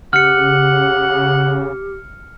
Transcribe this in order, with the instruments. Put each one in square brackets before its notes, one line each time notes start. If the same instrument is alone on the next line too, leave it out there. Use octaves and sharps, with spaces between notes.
[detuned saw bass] C#3 [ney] G4 [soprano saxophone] F#5 [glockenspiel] F6 C#7